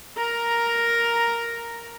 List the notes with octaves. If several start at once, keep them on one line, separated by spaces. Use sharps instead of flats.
A#4 A#5